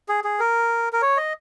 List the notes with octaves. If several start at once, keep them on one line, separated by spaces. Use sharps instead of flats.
G#4
G#4
A#4
A#4
C#5
D#5